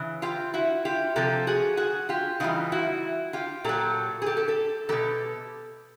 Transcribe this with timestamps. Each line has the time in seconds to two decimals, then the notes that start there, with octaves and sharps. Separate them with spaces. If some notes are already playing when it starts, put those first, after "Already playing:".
Already playing: C#3 E3
0.22 F4 G4
0.54 E4 F#4
0.85 F4 G4
1.16 C3 F3 G4 A4
1.47 F#4 G#4
1.77 F#4 G#4
2.09 F4 G4
2.40 C#3 E3 G3 D#4 F4
2.72 E4 F#4
3.33 F4 G4
3.64 A#2 F#3 G4 A4
4.22 G#4
4.26 G4 A4
4.37 G4 A4
4.48 G4 A4
4.89 B2 F#3 G4 A4